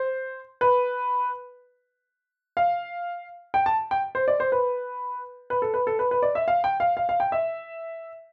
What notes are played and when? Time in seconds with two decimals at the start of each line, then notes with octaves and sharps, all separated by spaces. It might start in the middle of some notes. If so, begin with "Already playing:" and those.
Already playing: C5
0.61 B4
2.57 F5
3.54 G5
3.66 A5
3.91 G5
4.15 C5
4.28 D5
4.40 C5
4.52 B4
5.50 B4
5.62 A4
5.74 B4
5.87 A4
5.99 B4
6.11 B4
6.23 D5
6.35 E5
6.48 F5
6.64 G5
6.80 F5
6.97 F5
7.09 F5
7.20 G5
7.32 E5